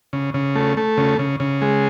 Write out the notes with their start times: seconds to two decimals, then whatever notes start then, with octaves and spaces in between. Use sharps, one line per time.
0.13 C#3
0.34 C#3
0.56 A3
0.77 A3
0.97 C#3
1.19 C#3
1.40 C#3
1.62 G#3